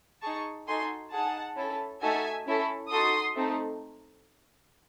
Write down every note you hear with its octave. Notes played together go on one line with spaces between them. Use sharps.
D#4 G#4 A5 C#6
D#4 F#4 A4 G#5 C6
D#4 G#4 F#5 A5
C#4 E4 A4
A3 D#4 F#4 A4 E5 G#5
C#4 E4 A4
D#4 F#4 A4 C6 D#6
A3 C4 D#4 A4